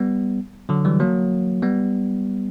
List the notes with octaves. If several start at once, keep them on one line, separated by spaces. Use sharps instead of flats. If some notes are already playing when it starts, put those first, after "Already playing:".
Already playing: G3 B3
D3 F#3
E3 G3
F#3 A#3
G3 B3